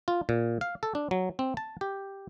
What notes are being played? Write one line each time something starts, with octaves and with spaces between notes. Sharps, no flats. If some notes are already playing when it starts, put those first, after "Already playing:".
F4
A#2
F5
A4
D4
F#3
C4
A5
G4